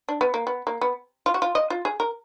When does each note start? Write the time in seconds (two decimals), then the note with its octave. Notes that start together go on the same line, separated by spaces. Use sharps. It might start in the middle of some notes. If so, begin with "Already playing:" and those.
0.09 D4
0.21 B3
0.34 A#3
0.47 B3
0.67 A#3
0.81 B3
1.26 F4
1.34 F#4
1.42 F4
1.55 D#5
1.70 F4
1.85 G#4
2.00 A#4